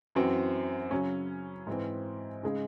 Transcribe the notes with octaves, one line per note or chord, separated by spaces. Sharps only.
F#2 E3 C4 F#4
C#3 F#3 C#4
G#2 E3 C4
C#3 G#3 D#4 G#4